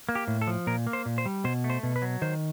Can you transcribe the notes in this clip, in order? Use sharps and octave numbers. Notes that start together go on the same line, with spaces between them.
A#3
G4
A2
A4
F3
A#2 A#4
A#3
C5
A#2
C5
G3
B2 C5
A3
C5
B2
B4
F#3
D#3 C5